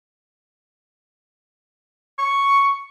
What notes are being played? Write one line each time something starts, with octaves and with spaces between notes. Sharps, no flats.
C#6